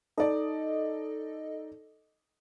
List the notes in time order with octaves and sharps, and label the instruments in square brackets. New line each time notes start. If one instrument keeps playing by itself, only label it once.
[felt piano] D#4 D5 [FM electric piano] A4 D#5